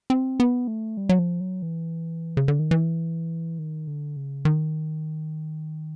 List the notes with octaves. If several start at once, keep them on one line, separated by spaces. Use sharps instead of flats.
C4
B3
A3
G3
F#3
F3
F#3
E3
C#3
D3
D#3
E3
D#3
D3
C#3
D#3